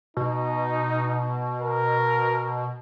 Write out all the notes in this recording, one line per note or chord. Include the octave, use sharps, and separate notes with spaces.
B2 D#4
A#4